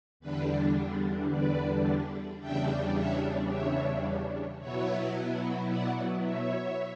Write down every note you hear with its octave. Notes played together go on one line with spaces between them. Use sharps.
E2 D3 G3 D4 B4
B4 D5
E2 C#3 G3 D4 E5 G5
C#5 E5
C#5 E5
B2 F#3 B3 E4 C#5 E5
D5 F#5
C#5 E5